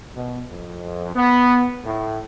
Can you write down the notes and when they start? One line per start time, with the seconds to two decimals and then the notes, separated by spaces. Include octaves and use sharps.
0.16 B2
0.49 F2
1.14 B3
1.84 A2